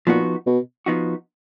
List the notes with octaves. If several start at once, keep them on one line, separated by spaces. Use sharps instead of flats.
A#2 F3 B3 D#4 F#4
B2
F3 B3 D#4 F#4